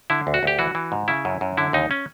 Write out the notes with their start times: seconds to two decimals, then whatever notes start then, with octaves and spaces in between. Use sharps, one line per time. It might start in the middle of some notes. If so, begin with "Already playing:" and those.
0.10 D3 E4
0.27 D2
0.34 F#4
0.43 D2 G4
0.59 E3 F#4
0.75 E3
0.92 G#2
1.08 C#3 E4
1.25 F#2
1.41 F#2
1.57 D3 E4
1.73 D#2 D#4
1.91 C#4